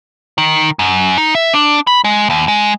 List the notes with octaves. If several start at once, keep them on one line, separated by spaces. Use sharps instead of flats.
D#3
F#2
D#4
E5
D4
B5
G#3
D#2
G#3